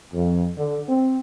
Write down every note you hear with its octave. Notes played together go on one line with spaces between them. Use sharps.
F2
D3
C4